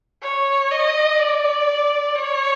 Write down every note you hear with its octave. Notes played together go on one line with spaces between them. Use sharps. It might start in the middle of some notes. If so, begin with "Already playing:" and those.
C#5
D#5
D5
C#5